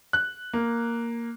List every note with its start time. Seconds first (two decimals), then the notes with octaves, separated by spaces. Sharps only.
0.13 F#6
0.53 A#3